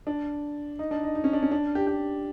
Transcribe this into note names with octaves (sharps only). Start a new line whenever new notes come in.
D4
D#4
D4
D#4
D#4
C#4
D4
C#4
D4
G4
G4